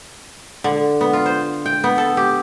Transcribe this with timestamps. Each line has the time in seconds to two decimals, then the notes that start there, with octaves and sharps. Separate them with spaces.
0.64 D3
1.01 B3
1.13 F4
1.26 C5
1.66 G5
1.84 B3
1.98 A4
2.17 G4